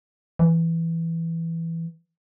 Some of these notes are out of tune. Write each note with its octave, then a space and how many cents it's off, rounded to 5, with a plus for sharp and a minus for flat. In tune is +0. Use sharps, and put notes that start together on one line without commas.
E3 +5